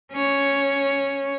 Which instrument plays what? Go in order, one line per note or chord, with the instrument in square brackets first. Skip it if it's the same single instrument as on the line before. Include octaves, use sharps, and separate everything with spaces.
[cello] C#4 C#5